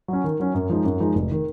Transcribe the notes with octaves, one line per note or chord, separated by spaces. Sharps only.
F#3 C#4
D#3
F#3 C#4
F#2
F3 G#3 D#4
F#2
F3 G#3 D#4
F1
D#3